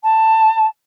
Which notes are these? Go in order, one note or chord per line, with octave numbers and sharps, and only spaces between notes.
A5